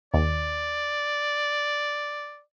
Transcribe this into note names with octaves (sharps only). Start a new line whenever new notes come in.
D#2 D5